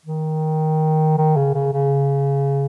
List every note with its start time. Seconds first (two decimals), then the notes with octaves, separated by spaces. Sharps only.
0.06 D#3
1.18 D#3
1.37 C#3
1.55 C#3
1.73 C#3